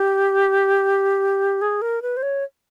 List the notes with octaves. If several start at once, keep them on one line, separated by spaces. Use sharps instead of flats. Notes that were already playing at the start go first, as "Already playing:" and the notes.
Already playing: G4
G#4
A#4
B4
C5
C#5